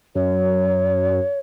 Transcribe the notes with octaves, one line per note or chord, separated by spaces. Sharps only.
F#2 C#5